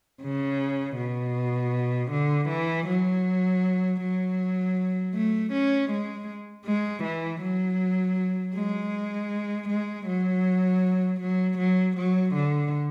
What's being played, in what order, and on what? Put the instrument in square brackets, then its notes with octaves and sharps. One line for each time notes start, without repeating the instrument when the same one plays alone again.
[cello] C#3
B2
D3
E3
F#3
F#3
A3
C#4
G#3
G#3
E3
F#3
G#3
G#3
F#3
F#3
F#3
F#3
D3